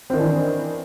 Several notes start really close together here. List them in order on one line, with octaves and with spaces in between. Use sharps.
C4 D#3 D4 E3